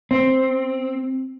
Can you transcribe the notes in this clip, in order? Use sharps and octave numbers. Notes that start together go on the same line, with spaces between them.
C4